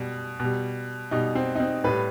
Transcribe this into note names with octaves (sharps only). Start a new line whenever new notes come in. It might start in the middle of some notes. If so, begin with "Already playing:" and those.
Already playing: B2 G3
B2 G3
B2 G3 D#4
C4
D#4
C4
A2 G3 B4